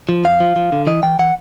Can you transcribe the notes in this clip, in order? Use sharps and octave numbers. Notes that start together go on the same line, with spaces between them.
F3
F2 F5
F3
F3
D3
E3 D#5
E3 G5
E3 F#5